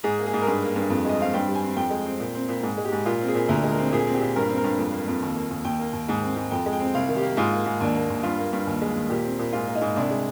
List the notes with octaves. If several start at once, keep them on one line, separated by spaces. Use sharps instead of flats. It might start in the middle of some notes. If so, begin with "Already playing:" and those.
G#2 G#4
A#3
G#4
G#2
A#4
G2 G#4
A#3
G2
F2
G#3 D#5
C4 F5
G2 G5
G3
G#5
C4
F2 G5
G#3
C4
A#2
C4
A#2
G#2
G#3
G4
G#2
A#2 F4
C4
G#4
A#2
D2 A#4
G#3
A#4
C4
A#2 G#4
C4
G4
A#2
G2 A#4
C4
A#4
G2
F2
A#3
F2
D#2
A#3
D#2
D#2 G5
A#3
D#2
G#2
C4
G#2
F2 G5
G#3
G5
C4
C2 F5
D#3
G4
A#3
G#2 F4
A#3
G#2
D#2 D4
A#3
D#2
G2 F4
A#3
G2
D#2
G#3
D#2
A#2 G4
C4
A#2
G#2 F4
A#3
D#4
G#2
C2 D4
G#3